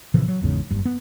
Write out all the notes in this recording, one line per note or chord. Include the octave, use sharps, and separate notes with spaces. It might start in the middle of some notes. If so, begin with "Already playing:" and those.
A#2 C#3 E3 F3
F#3
G#1 E2 G#2 C#3
F#1 G2
B3